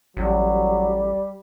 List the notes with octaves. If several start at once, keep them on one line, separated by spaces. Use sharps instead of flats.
A1 F#3 G3